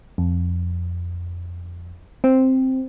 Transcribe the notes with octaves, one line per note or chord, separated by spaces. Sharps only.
F2
C4